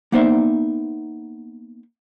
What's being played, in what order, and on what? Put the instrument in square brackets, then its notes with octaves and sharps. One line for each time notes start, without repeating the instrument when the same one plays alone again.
[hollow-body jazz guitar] A#3 B3 D#4 C5 D5 E5